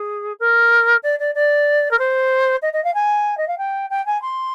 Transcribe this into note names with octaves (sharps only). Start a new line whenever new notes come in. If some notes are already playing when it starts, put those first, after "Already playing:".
Already playing: G#4
A#4
D5
D5
D5
A#4
C5
D#5
D#5
F5
G#5
D#5
F5
G5
G5
G#5
C6